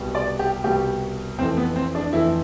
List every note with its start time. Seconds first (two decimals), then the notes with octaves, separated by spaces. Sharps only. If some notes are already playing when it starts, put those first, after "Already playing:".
Already playing: C2 B2 G3
0.15 D5
0.39 G4
0.64 C2 B2 G3 G4
1.39 F2 E3 A3 C4
1.57 B3
1.76 C4
1.95 D4
2.13 F2 E3 A3 E4